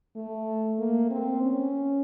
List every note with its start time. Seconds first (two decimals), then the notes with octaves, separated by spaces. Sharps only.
0.16 A3
0.79 A#3
1.11 C4
1.42 C#4